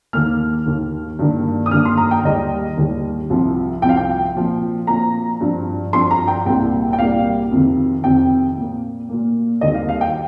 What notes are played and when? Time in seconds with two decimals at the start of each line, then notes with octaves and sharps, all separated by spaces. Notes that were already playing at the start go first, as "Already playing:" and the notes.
0.13 D#2 D#3 A#3 F6
0.66 D#2 D#3 A#3
1.19 G2 D#3 A#3
1.66 D#6
1.71 G2 D#3 A#3 F6
1.85 C6
1.98 A#5
2.11 G5
2.24 D#2 D#3 G3 D#5
2.77 D#2 D#3 G3
3.30 C2 C3 F3 C4
3.82 C2 C3 F3 C4 G5
3.89 F5
3.97 G5
4.36 A#2 F3 C4
4.87 A#2 F3 C4 A#5
5.40 G2 F3 C4
5.93 G2 F3 C4 C6
6.11 A#5
6.28 G5
6.45 C2 A#2 G3 A#3 G5
6.93 G5
6.99 C2 A#2 G3 A#3 F5
7.51 F2 C3 D#3
8.04 F2 C3 D#3 G5
8.57 A#2 A#3
9.09 A#2 A#3
9.61 D#2 D#3 G3 C4 D#5
9.74 F5
9.89 F5
10.01 G5